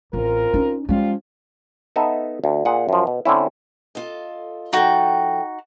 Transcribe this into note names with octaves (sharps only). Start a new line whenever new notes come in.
A1 C4 F4 A#4
C#4 D#4
F3 G3 G#3 C#4 F4
B3 D#4 A4 E5
D2
A#2 G#4 F#5
F#2 F3
B2
D3 C4 C#4 E4
F4 A4 D#5
F3 D#4 F#4 A4 G5